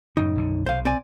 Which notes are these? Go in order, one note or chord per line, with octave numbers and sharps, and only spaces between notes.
F#2 A2 C#3 D#4
B1 F#2 D3
B1 C3 C5 F5
C4 D5 G#5